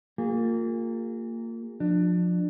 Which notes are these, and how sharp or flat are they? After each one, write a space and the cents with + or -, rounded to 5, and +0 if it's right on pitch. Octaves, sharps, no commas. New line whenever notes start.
A#3 -30 F4 +25 G#4 -35
F3 +25 D4 +25